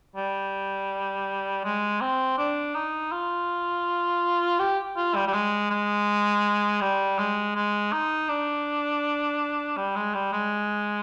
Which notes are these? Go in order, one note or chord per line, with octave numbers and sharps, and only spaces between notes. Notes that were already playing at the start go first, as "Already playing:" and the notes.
G3
G#3
C4
D4
D#4
F4
G4
F4
G3
G3
G#3
G#3
G3
G#3
G#3
D#4
D4
G3
G#3
G3
G#3